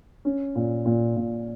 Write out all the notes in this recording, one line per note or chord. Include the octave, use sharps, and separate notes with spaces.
C#4
A#2
A#2
A#2